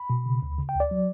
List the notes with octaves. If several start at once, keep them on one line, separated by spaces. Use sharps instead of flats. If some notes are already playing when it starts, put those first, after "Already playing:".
Already playing: B5
B2
C#3
D2
C#3
G5
D2
D5
F#3